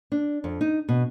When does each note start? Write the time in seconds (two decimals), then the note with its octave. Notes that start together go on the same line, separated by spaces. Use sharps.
0.12 D4
0.44 F2
0.61 D#4
0.89 B2